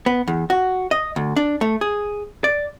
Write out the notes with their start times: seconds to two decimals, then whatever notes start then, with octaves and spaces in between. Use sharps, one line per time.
0.06 B3
0.28 E2
0.50 F#4
0.91 D#5
1.16 D2
1.36 D4
1.61 A3
1.81 G#4
2.44 D5